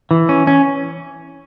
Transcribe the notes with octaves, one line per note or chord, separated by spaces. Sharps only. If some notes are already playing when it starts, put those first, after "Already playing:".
E3
C#4
C#4